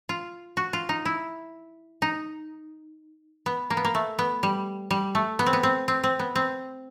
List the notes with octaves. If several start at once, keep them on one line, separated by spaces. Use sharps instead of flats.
F4
F#4
F4
D#4
E4
D#4
B3
A#3
B3
A#3
A3
B3
G3
G3
A3
B3
C4
B3
C4
C4
C4
B3
C4